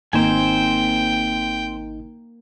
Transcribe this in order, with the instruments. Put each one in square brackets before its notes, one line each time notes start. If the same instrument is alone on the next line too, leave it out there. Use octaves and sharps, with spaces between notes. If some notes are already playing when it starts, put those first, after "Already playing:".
[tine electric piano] G#1 D#4 [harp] A#3 [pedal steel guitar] C4 C5 G#5 [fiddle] G5